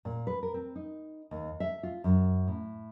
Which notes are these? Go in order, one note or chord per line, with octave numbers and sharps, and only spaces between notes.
A#2
B4
A#4
C4
D#4
D#2
E5
F4
F#2
A2